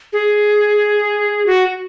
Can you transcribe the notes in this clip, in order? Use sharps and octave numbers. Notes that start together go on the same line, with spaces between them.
G#4
F#4